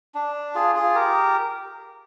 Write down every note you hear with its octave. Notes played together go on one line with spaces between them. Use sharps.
D4
F4 G#4
F4 G#4
G4 A#4